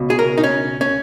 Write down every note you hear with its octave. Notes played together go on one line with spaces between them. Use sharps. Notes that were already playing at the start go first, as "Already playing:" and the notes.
Already playing: C#2 B2
G#4
A#4
D#4
C#4
C#4